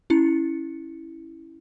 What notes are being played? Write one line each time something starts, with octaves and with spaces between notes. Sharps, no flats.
C#4 E4 C#7